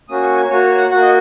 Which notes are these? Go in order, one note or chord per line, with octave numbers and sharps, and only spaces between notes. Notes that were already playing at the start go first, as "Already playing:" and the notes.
A#3 C#4 F#4 D#6
C#6
G#5
A#3 F#4 C#5
C#5
F#5
A#3 F#4 F#5
D#5